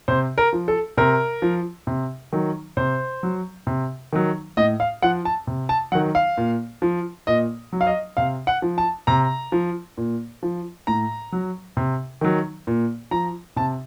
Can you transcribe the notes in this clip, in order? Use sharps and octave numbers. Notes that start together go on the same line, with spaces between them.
C3 C5
A#4
F3
A4
C3 A#4
F3
C3
D#3 F#3
C3 C5
F#3
C3
D#3 F#3
A2 D#5
F5
F3 F#5
A5
C3
A5
D#3 F#3 F#5
F5
A#2
F3
A#2 D#5
F#3
F5
D#5
C3 F5
F#5
F3
A5
C3 A#5
F3
A#2
F3
A2 A#5
F#3
C3
D#3 F#3
A#2
F3 A#5
C3 A5